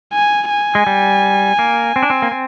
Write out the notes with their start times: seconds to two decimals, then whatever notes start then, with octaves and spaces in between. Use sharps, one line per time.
0.13 G#5
0.50 G#5
0.75 G#3
0.87 G3
1.59 A#3
1.96 C4
2.03 D4
2.10 C4
2.22 A#3
2.32 C4